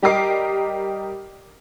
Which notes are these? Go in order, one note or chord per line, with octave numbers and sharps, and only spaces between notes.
G3 G4 A#4 D#5 D6 C7